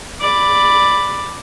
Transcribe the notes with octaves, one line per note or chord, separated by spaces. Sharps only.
D5 B5